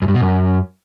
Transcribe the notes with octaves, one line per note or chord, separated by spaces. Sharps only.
F#2
G2
B2
F#2